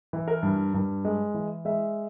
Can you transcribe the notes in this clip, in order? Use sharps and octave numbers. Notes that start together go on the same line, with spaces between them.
E3
A#4
G2
G2
G#3
E3
G#3 E5